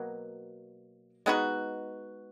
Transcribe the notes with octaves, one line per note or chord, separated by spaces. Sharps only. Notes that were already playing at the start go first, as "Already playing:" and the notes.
Already playing: B2 F#3 A#3
G#3 B3 D#4 F#4